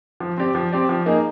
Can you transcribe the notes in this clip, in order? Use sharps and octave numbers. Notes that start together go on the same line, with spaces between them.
F3
C4 G4 D5
F3
C4 G4 D5
F3
A#3 D#4 G#4